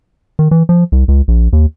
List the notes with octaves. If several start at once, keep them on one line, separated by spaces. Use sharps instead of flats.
D#3
E3
F3
C2
C#2
A#1
D#2